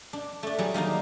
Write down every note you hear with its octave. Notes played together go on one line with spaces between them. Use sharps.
D4
A3 D4
F#3 G3 G#4
D#3 A#3 D4 D#4